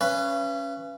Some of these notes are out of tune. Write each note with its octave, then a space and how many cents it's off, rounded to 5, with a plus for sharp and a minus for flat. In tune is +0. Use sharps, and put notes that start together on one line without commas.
C#4 +0 B4 +0 F5 -40